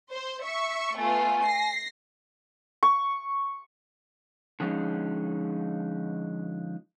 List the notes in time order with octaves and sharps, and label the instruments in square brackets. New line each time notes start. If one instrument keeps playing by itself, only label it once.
[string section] C5
E5 C#6
[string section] A3 B3 F4 [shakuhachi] G#5
[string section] A#6 C7
[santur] C#6
[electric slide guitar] D3 F3 G#3 C#4 D#4